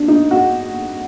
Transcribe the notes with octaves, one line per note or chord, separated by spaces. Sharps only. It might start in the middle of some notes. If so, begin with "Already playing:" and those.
Already playing: D4
D#4
F#4